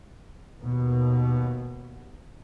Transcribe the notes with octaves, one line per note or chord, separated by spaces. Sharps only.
D#2 B2